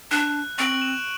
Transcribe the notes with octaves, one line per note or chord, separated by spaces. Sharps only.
D4 F#6
C4 C#6 D7 F#7
E7